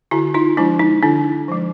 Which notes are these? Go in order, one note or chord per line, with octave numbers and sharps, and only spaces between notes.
D3 E4 F#4
D#4 F4
F3 G#3 D4 E4
D#4
D3 D4 E4
F3 G#3